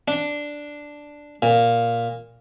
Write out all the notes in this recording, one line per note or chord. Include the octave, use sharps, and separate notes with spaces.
D4
A#2